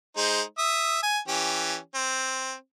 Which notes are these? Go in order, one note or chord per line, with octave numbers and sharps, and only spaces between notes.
G#3 D#4 C5
E5 D#6
G#5
E3 C#4 G4
C4